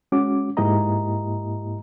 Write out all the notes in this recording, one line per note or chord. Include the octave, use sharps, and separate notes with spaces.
G#3 C#4 F#4 D6
G#2 A#3 E4 G4 D#5 A#5